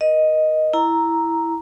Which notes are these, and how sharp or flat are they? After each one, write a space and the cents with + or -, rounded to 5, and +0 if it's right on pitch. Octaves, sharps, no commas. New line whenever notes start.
A#4 +35 D#5 +0
E4 +0 A#5 +0